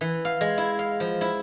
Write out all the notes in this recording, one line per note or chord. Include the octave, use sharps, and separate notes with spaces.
E3
F5
G#3
E4
F5
F3
E4